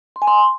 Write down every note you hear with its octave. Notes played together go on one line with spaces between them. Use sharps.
C6
G#5
C6